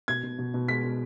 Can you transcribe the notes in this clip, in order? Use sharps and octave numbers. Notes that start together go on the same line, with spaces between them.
B2 G#6
B2
B2
B2
G#3 B6
B2